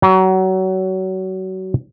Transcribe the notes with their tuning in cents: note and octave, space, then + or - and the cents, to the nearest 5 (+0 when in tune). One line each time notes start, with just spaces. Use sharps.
F#3 +30